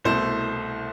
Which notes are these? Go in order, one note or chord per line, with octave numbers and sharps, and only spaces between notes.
C2 B2 A3 E4 C5